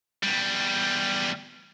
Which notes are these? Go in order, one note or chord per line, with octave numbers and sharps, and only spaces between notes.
E2 G3